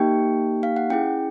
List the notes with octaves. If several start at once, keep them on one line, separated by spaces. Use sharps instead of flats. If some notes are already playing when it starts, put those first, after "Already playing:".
Already playing: A#3 D#4 G4 G5
F5
F#5
C#4 E4 G#4 G5